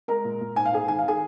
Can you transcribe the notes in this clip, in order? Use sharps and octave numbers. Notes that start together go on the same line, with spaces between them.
G#3 A#4 A#5
A#2
A#2
G#2 G#5
F5
G#2 G#4 G#5
D#3 G#5
F5
D#3 G#4 G#5